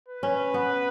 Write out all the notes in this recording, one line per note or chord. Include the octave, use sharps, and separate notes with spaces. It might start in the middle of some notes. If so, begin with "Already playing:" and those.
B4
C#4
B3